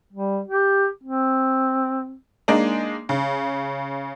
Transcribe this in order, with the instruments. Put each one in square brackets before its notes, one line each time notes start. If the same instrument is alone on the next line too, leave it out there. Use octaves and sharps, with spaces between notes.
[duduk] G3
G4
C4
[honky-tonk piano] G#3 A#3 D4 D#4
C#3